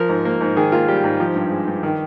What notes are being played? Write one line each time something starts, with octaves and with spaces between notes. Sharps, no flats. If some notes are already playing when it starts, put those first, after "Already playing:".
Already playing: F3 A#4
G#2
A#3
G#2
D#3 G#4
A#3 F4
G3 G4
G#2
F3
G2
G#3
G2
D#3